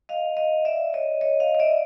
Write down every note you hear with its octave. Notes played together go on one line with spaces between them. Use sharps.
D#5 F5
D#5 F5
D5 E5
C#5 D#5
C#5 D#5
D#5 F5
D#5
D5 E5